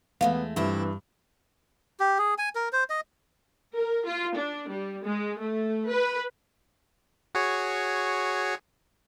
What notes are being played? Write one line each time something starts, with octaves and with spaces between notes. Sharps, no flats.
E2 G#3 A3 B3 F5
G2 E3 C4 E4 F4
G4
G#4
G#5
A#4
C5
D#5
A#4
F4
D4
G3
G#3
A3
B4
F#4 G#4 C#5